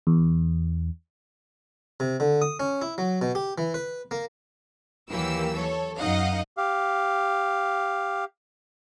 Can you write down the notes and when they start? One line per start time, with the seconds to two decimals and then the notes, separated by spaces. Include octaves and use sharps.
0.07 E2
2.00 C3
2.20 D3
2.42 D#6
2.60 C#4
2.82 E4
2.98 F#3
3.21 B2
3.35 G4
3.58 E3
3.74 B4
4.11 A#3
5.10 D#2 E3 F#3 A#3 G4 E6
5.56 A4 C#5
5.99 F#2 D#4 D#5 F5 F#5
6.57 G4 F5